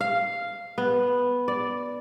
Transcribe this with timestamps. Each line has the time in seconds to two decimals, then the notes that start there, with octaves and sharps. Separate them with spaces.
0.01 F5
0.78 B3
1.48 D5